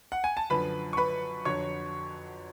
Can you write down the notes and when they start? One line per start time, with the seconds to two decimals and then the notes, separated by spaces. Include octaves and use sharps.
0.12 F#5
0.24 G#5
0.37 A5
0.50 F#2 D3 F3 B4 B5
0.93 C#6
0.97 B4 B5
1.45 F2 D3 F#3 C#5 C#6